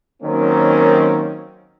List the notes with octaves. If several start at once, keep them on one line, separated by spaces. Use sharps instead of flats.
D#3 F#3 A#3 C4 C#4 D#4